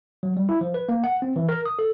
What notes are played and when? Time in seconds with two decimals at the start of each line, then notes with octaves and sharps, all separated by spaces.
0.23 F#3
0.37 G3
0.49 E4
0.61 F3
0.74 B4
0.89 A#3
1.04 F#5
1.22 C4
1.36 E3
1.49 A#4
1.66 D#6
1.79 A4